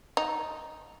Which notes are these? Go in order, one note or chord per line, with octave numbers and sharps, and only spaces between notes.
D#4